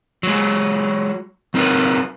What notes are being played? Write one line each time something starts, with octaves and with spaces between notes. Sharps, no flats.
F#3 G#3
F#3 C4 D#4 A#4 B4